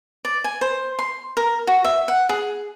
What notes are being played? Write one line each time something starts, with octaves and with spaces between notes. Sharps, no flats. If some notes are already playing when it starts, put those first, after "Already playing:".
D5
G#5
C5
C6
A#4
F#4
E5
F#5
G#4